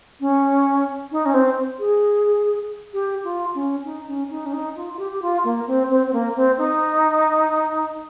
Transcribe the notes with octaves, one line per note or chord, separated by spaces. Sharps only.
C#4
D#4
C#4
C4
G#4
G4
F4
C#4
D#4
C#4
D#4
C#4
D#4
F4
F4
G4
G4
F4
A#3
C4
C4
C4
A#3
C4
D#4